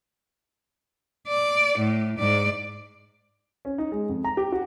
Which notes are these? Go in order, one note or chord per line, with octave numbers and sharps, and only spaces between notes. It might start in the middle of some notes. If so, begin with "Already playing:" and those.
D5
A2
G#2 D5
C#4
D#4
G#3
F2
A#5
G4
F#4